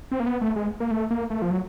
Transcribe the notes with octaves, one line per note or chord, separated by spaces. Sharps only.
C4
A#3
B3
A3
G#3
A#3
A3
A#3
A3
F3
F#3